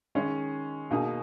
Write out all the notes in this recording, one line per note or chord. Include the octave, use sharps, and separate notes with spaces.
D#3 G#3 C#4
B2 A#3 D#4 G#4